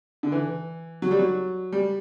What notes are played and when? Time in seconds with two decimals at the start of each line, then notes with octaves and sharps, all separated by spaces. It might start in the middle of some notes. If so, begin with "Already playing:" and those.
0.23 D3
0.32 E3
1.02 F#3
1.11 G3
1.19 F#3
1.72 G3